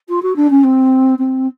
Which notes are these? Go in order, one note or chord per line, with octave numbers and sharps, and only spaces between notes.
F4
F#4
D4
C#4
C4
C4